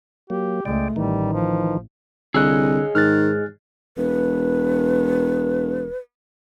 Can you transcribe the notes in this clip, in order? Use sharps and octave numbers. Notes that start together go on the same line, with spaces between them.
F#3 A#3 G4
C#2 G#3 A3 D5 G5
A1 D#3 E3 G3 D#4
F3
C2 D3 G#4 C#5 D#5 E6 F#6
G#2 D#3 F6 F#6 A6
E1 B4